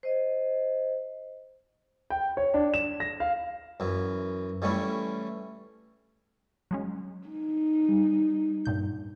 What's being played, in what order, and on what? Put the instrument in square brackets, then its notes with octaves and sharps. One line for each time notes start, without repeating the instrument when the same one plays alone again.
[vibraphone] C5 D#5
[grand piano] G5
C#5
D4
E7
A#6
F5
[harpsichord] F#2 E3
E3 G3 A3 C#4 E4
[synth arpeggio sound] F#3 G#3 C#4
[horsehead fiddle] D#4
[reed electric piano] G3
[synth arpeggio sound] G2 A#2 G6